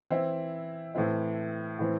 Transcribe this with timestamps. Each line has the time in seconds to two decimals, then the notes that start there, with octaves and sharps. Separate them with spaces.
0.10 E3 C4 E4
0.95 A2 E3 C4 E4
1.79 A2 E3 C4